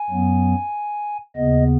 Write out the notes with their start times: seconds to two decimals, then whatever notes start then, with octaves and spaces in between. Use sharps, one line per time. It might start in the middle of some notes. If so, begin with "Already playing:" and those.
Already playing: G#5
0.10 F#2 F#3 B3
1.36 D#2 C#3 B3 D#5